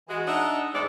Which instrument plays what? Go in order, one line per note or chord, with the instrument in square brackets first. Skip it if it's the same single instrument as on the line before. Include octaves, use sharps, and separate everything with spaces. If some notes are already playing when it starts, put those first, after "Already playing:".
[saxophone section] E3 G#3 F#4
D4 D#4 D#5 E5 F#5
E2 A2 G#3 A4 C5 D5